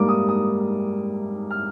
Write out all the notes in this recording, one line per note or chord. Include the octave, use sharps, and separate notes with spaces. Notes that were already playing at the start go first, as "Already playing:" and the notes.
Already playing: G#2 G3 A#3 D6
D#6
D#6
F6